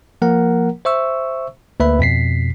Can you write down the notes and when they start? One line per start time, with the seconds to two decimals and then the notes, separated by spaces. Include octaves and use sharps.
0.22 F3 A#3 A#4 F#5 A#5
0.85 C5 E5 C#6 E6
1.80 D2 A#3 B4 E5 B5
1.99 F2 B2 B6 C7